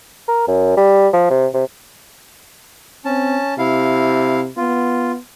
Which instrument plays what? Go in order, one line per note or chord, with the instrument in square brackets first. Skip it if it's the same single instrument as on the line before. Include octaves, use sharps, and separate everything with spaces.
[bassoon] A#4
F#2
G3
F3
C3
C3
[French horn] C4 [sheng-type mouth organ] C#4 A5
[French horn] C3 [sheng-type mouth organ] E4 F5
[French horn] B3 [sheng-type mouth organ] F4